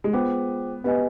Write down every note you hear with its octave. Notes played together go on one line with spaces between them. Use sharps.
G#3
B3 F4 G#4 C5 G5 D6
B3 G4 B4 D#5 G#5